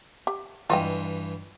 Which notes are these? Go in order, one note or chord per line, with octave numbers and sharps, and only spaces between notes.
G4
G2 E3 F4 D#5 G5